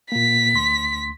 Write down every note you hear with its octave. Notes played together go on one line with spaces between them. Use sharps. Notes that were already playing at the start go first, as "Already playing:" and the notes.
A#2 A#3 B6
D2 C6